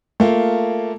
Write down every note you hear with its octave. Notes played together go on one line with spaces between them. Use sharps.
A3 A#3 F4